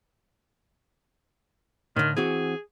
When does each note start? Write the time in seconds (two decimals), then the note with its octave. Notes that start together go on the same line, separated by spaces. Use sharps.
1.96 A2 D3 D#3
2.17 E3 C4 F#4 G#4